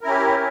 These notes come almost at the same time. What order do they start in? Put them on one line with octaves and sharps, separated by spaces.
A#4 E4 C#4 G4